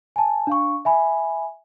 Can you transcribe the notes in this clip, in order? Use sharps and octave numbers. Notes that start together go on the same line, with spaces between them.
G#5 A5
D4 F5 C#6
E5 G#5 B5